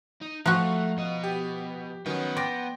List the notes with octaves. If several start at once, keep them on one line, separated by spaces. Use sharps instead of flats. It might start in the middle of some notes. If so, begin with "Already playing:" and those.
D#4
F3 A3 F#4 F5 A#5 F#6
B2 D#5
G4
D#3 F#3 B3 C#4
D5 G5 C6 A#6